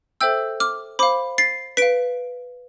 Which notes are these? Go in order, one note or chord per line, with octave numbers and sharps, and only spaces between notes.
A4 C5 E5 G5 E6 G6
D6 F6
C5 F5 B5 D6
A6 C7
B4 F5 B6 D7